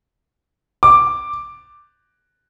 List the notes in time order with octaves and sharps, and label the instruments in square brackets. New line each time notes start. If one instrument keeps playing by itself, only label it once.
[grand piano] D6